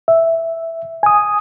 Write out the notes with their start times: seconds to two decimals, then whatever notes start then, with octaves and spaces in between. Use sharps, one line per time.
0.08 E5
1.03 G#5 D#6